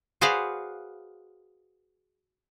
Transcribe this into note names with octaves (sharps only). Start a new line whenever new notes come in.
F#4 G#4 B4 C5 D5 F5